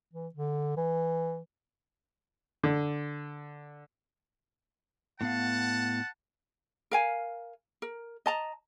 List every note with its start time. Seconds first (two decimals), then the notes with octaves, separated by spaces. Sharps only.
0.13 E3
0.34 D3
0.77 E3
2.64 D3
5.21 A2 B3 F5 F#5 A5
6.91 A#4 F5 G#5
7.82 A#4
8.26 D#5 A5 A#5